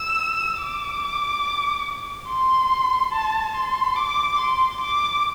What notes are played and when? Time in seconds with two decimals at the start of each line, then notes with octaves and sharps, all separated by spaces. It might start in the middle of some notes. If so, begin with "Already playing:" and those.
Already playing: E6
0.59 D6
2.29 C6
3.12 A5
3.55 C6
3.96 D6
4.38 C6
4.80 D6